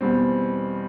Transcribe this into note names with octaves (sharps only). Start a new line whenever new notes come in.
E2 B2 G3 C4